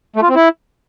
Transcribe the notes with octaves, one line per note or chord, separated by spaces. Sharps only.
A3
F4
C4
E4